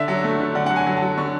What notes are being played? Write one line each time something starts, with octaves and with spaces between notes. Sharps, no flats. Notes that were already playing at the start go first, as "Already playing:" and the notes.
Already playing: D3 E5
F#3
A3
D3
D3 F#5
F#3 F#5
G#5
F#3
A5
F#3
D3 C#6